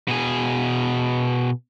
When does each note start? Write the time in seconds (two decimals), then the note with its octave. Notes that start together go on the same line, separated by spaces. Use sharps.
0.08 B2 G#4